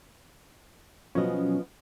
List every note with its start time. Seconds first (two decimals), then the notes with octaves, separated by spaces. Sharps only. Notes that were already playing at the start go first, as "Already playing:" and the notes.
1.15 B2 F3 F#3 B3 C#4 D#5